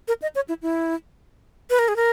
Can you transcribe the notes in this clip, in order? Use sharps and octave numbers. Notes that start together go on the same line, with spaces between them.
A#4
D#5
C#5
E4
E4
B4
A#4
G#4
A#4